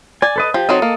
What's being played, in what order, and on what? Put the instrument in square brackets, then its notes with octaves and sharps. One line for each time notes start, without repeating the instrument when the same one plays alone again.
[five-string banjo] D5 [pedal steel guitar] G#5
[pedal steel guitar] A4 B4 D#5
[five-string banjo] F3 [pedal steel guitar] G4
[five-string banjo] F#3 C4 D#4 [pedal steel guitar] A4 D#5
[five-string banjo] A#3